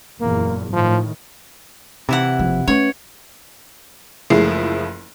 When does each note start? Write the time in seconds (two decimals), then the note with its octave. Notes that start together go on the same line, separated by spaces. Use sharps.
0.21 F#1 E2 A#2 A#3
0.73 A2 D#3 F3
2.09 C3 E3 E4 F#5
2.39 F#1 F3
2.68 A3 C#4 B4 C#5
4.30 F#1 F3 G#3 A3 E4 C7